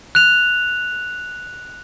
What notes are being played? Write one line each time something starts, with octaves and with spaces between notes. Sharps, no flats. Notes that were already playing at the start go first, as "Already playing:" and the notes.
F#6 F7